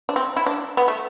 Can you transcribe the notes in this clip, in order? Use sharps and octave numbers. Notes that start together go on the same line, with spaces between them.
D4
C4
E4
D4
B3
A3